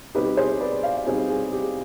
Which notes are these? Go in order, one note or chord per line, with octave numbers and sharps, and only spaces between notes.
B2 G3 C4 D#4 G4 B4
G#4 C5
B4 D5
D5 F5
B2 G3 C4 D#4 G#4
G#4
G4